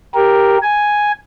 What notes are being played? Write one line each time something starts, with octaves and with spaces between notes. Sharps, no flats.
G4 A#4
G#5